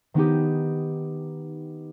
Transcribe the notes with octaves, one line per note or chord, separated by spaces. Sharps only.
D#3 B3 D#4 G4